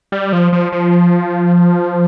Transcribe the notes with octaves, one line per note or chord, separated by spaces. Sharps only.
G3
F3
F3
F3